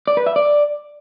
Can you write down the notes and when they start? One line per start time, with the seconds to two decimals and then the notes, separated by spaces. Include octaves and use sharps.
0.08 D5
0.17 B4
0.26 E5
0.36 D5